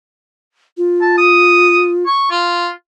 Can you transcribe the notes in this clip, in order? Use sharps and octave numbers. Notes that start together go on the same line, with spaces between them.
F4
A5
D#6
C#6
F4